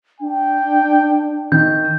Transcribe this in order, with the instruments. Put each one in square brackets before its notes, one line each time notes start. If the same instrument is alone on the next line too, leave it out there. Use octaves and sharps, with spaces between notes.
[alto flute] D4 [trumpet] G5
[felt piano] D#3 [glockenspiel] G6